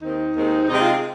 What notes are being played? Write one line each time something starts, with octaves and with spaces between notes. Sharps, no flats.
D#2 D#3 C4 D#4
D#2 D#3 G#3 C4
C3 G#3 C4 D#4
F4